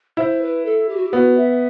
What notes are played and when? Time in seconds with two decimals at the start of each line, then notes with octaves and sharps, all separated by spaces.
0.17 E4 C5
0.41 B4
0.65 A4
0.89 G4
0.96 F#4
1.05 G4
1.13 B3 F#4
1.37 E5